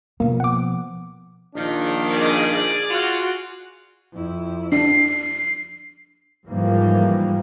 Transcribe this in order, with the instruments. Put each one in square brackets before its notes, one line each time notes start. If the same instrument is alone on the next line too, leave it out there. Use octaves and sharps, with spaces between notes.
[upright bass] B2 F3 [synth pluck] A#3
[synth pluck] F#5 D6
[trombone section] A#1 D4 [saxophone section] D#3 F4
[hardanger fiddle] G#4 D5
[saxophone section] F4 F#4
[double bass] F2 E4
[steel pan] D4 [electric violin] C7
[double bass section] G#2 E3 F3 G3 A#3